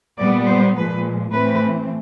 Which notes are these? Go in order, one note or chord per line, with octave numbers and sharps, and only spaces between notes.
A#2 G3 B3 D5
C5
A#2 F3 G#3 B4
A2 E3 A3 C4 B4